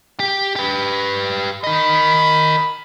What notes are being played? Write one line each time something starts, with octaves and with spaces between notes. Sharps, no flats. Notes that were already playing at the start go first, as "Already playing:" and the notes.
G4
G4 B4
A#4 D#5 B5